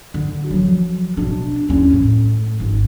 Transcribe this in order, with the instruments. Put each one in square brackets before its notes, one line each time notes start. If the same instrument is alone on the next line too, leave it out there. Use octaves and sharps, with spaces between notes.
[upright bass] D3
F3 F#3
B2 D4
E2 C#4
A2
G#1